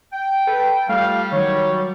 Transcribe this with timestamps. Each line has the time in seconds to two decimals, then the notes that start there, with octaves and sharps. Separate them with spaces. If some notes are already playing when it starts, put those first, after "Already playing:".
0.13 G5
0.47 A4 B4
0.89 G3 A3 F4 G4 F5
1.32 D#3 F#3 C#5